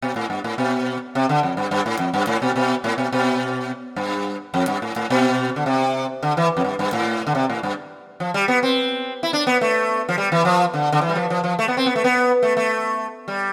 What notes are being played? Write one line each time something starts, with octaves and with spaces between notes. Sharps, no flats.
B2
A2
G2
A2
B2
C3
D3
F2
G2
G2
A2
F2
G2
A2
B2
B2
A2
B2
B2
G2
F2
G2
A2
A2
B2
D3
C3
D3
E3
F2
G2
G2
A2
D3
C3
A2
G2
F3
G3
B3
C4
E4
D4
B3
A3
F3
G3
E3
F3
D3
D3
E3
G3
F3
F3
F3
A3
B3
C4
B3
A3
B3
A3
A3
G3